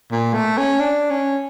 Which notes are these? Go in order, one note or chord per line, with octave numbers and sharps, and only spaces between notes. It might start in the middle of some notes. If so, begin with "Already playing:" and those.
A#2
A3
C#4
D4
C#4